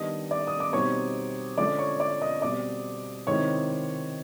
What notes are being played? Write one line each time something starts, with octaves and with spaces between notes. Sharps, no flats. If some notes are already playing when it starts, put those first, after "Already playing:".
Already playing: D#3 G3 B3 D4 D#5 D#6
D5 D6
D#6
D6
B2 G3 C4 D#4 C#5 C#6
D3 F3 G#3 C#4 D5 D6
C#5 C#6
D5 D6
D#5 D#6
B2 G3 C4 D5 D6
C3 D#3 G#3 C4 E4 C#5 C#6